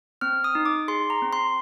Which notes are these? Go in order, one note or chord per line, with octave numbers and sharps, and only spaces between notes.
C4 F6
D#6
D#4
D6
G#4 C6
A#5
C4
C6